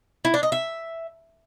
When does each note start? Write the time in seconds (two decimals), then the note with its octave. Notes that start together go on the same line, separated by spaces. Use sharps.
0.25 E4
0.34 D4
0.43 D#5
0.52 E5